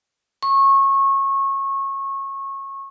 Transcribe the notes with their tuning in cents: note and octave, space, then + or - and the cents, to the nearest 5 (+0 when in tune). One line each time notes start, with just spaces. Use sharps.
C#6 -25